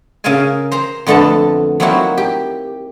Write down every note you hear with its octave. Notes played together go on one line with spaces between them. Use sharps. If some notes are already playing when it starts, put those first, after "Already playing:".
C#3 A#4 E5 F5 G#5
C5 A#5 C6
F2 D3 A3 B3 A5
F#3 A#3 C4 D#4 E4 F#4
G4